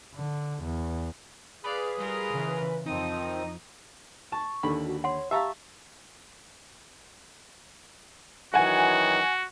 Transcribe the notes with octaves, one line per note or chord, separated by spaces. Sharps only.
D3
E2
G#4 B4 D5 F5
G3 F4 A#4
C#3 E3
F2 D#3 F3 C4 D#4 D#6
A5 C#6
D#2 D3 B5
F#4
C#5 F#5 C6
G4 E5 F5 A5 A#5 C#6
F#2 D#3 E3 F#4 F#5 G#5